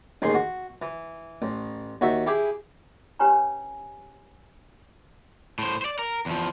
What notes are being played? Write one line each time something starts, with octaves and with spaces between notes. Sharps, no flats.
A1 D#2 G#4 C6
F#4
E3
A1
D#2 F#4 E5
E4 G4 G#4
C#4 G4 B4 C#5 G#5 A#5
A2 C5
C5 D5
A#4
E2 F3